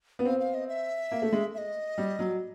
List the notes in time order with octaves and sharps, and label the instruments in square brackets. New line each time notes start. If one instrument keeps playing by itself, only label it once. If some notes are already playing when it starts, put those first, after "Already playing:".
[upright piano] B3
[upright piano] C4 [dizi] F5
[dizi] F5
D#5
E5
[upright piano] A#3
A3
G#3
[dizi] E5
D#5
[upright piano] G3
F#3